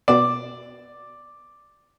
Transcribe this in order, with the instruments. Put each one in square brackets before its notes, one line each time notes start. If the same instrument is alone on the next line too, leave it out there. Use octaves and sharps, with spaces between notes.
[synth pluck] B2 B3 E6 [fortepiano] D5